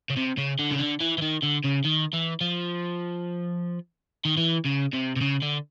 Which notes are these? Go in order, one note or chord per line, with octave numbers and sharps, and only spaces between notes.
C#3
C3
C#3
D3
C#3
D3
E3
E3
D#3
D3
C#3
D#3
E3
F3
D#3
E3
C#3
C3
C3
C#3
D3